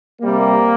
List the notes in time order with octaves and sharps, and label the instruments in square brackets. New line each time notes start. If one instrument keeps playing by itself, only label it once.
[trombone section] C3 G3 A#3